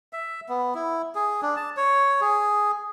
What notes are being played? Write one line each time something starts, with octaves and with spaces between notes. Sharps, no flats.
E5
B3
E4
G#4
D4
A5
C#5
G#4